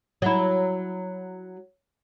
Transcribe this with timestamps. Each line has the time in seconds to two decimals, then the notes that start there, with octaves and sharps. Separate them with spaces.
0.22 F#3 E4